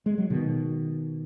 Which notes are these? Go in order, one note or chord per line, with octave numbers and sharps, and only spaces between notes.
G#3
F#3
B2 D#3